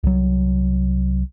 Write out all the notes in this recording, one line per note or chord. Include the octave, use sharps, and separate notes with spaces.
C2 F#3